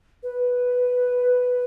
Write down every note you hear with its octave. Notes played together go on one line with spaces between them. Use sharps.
B4